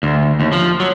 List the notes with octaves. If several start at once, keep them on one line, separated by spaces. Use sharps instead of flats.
D2
D#2
F3
F#3